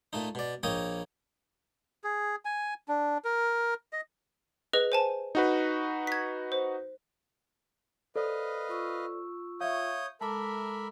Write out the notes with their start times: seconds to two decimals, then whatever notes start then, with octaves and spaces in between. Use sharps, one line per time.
0.13 A#2 A3 D#4
0.35 B2 D5
0.63 A#1 A#3 C#5 D#5 G5 D#6
2.04 G#4
2.45 G#5
2.88 D4
3.25 A#4
3.93 D#5
4.73 G#4 B4 D#5
4.92 C5 G#5 A5
5.35 D#4 F#4 B4
6.07 G#6 B6
6.52 C5
8.16 A4 B4 C5 D5 D#5 F5
8.69 F4 C#6 E6
9.61 C#5 E5 F5 D#6 G6
10.21 G#3 A4 A#4 E5 A5 B5 D6